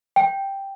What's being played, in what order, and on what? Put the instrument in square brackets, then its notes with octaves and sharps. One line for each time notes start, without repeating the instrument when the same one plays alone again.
[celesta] G5